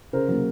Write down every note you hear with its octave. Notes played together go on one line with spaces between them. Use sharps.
C#3 A#4 C5
F#3 A#3